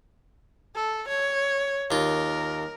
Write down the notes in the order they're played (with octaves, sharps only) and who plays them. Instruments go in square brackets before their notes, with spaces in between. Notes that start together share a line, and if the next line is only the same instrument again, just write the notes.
[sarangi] A4
C#5
[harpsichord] D#2 F4 [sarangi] A#4